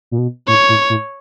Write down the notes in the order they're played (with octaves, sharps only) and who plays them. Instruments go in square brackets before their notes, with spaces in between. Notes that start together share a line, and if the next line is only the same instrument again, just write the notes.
[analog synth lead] A#2
B2
[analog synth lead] A2 [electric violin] C#5
[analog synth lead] A2
A2